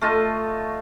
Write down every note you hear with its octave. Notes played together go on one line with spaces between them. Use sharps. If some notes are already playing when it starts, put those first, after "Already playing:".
A3 F4 D#5 A5